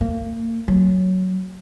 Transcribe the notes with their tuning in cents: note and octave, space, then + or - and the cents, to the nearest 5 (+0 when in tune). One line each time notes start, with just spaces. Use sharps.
A#3 -35
F#3 +5